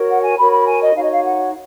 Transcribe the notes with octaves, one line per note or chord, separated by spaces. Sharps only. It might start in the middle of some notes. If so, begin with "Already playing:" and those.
Already playing: F#4 A#4 C#5
F#5
G#5
F#4 A#4 C#5 B5
B5
G#5
D#5
D#4 F#4 C#5 F5
D#5
F5
F#5